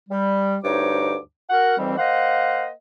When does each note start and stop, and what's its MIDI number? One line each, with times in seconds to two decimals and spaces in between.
0.09 0.56 55
0.64 1.17 38
0.64 1.17 43
0.64 1.17 63
0.64 1.17 72
0.64 1.17 73
0.64 1.17 86
1.50 1.77 66
1.50 1.77 70
1.50 1.77 78
1.77 1.97 41
1.77 1.97 51
1.77 1.97 52
1.77 1.97 55
1.77 1.97 60
1.98 2.69 58
1.98 2.69 72
1.98 2.69 75
1.98 2.69 77
1.98 2.69 78